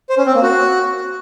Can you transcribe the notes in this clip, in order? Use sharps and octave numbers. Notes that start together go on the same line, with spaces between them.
C5
C#4
C4
A#3
F#4